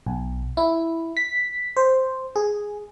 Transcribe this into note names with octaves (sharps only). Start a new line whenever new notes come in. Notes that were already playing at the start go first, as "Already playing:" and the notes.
B1
E4
B6
C5
G#4